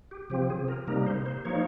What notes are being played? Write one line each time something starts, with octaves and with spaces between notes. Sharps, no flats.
G4
C3 F3 C4 G4
G#4
A#4
C3 G3 A#3 D#4 A#4
C5
C5
F3 A#3 D#4 C#5